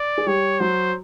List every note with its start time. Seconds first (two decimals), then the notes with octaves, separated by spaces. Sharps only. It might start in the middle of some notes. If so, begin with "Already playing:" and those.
Already playing: D5
0.18 G#4
0.26 G3 G4 C#5
0.60 F#3 F#4 C5